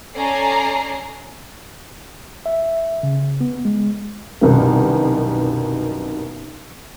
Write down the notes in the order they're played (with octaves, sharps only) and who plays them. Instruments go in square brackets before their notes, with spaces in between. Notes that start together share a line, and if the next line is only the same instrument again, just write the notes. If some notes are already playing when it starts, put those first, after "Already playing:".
[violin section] C#4 A4 D5 G#5 A#5 C7
[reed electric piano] E5
C#3
B3
G#3
[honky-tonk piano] C2 F#2 B2 D#3 B4